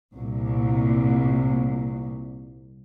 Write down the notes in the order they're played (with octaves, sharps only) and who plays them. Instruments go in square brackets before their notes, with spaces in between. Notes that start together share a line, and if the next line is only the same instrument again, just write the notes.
[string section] C2 A#2